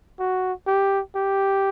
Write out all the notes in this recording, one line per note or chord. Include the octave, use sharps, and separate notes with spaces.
F#4
G4
G4